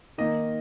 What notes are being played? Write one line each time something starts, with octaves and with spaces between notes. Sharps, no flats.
D#3 A#3 D#4 D#5